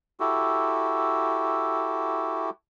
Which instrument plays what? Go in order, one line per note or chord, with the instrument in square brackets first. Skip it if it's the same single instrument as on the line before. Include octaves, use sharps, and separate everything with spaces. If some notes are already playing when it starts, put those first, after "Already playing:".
[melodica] E4 F#4 G4 A4